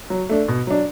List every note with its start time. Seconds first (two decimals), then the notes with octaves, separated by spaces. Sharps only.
0.10 F#3
0.29 A3 D4
0.48 B2
0.67 F#3 D4